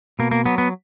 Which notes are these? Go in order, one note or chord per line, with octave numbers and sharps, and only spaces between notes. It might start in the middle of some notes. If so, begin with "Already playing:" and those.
B2 A#3
A#3
F#3 B3
B3